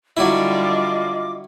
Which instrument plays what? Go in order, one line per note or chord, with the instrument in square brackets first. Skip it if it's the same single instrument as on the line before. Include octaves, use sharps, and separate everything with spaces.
[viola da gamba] D3 G3 [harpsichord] F#3 E4 [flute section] F4 D#5 D6